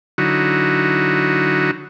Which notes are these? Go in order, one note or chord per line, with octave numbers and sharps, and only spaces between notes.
D3 F#3 D#4 E4 F#4